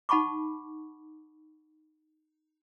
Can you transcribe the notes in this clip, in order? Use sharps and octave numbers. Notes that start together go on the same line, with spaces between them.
D#4 F#5 A5 B5 C#6 D6